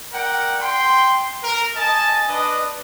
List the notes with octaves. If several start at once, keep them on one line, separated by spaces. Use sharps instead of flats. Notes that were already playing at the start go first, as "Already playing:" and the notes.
A#4 D5 F#5 G5
G5 C6
A#4
D#5 G#5 A5
D4 B4 D5 D#5